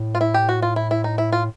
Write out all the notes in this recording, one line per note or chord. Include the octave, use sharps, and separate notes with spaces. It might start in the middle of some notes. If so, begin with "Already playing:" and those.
Already playing: A2
F4
E4
G4
F#4
F4
E4
E4
D#4
E4
F4